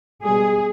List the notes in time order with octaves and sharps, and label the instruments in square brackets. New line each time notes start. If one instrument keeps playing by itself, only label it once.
[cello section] B2 G3 G#4